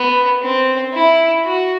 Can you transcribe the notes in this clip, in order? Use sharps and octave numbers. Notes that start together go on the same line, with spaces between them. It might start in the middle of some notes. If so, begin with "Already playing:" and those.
Already playing: B3
C4
E4
F#4